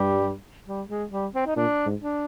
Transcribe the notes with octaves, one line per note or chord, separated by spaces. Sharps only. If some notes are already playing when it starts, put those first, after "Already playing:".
Already playing: G2 G3
G3
G#3
G3
C4
D#4
A#2 D4
G#2
D4